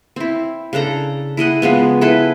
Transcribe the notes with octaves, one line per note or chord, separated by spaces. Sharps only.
C4 E4
C#3 D4 A4 A#5
E4 G#4 D#5 F#5
C#3 F3 G#3 B3
E4 G#4 A4 B4